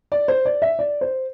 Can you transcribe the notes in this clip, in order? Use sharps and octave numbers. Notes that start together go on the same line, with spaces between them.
D5
C5
D5
E5
D5
C5